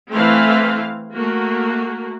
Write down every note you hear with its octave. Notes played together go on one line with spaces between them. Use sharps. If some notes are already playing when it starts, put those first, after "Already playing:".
E3 A3 C4 E4 F5
A3 A#3 F#4